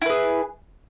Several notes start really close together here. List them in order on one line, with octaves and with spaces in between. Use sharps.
E4 B4 G#4